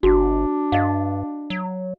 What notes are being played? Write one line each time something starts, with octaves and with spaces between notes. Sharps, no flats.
G1 D4 F#4
G2 D#5 F5
F#3